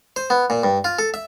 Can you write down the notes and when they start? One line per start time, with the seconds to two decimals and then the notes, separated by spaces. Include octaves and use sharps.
0.16 C5
0.30 B3
0.50 A#2
0.64 G2
0.84 F4
0.99 A4
1.14 E5